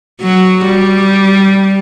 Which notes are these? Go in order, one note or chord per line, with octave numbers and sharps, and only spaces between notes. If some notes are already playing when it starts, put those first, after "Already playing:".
F#3 F#4
G3